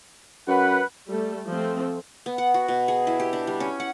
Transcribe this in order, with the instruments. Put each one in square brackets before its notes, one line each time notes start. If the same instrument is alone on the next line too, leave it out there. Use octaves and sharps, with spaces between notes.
[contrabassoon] F#2 [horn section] B4 F#5
[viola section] G3 A3 A4
F3 A3 C4
[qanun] B3
F#5
F#4
B2
G#4
E4
G4
D4
G3
C#4
F#5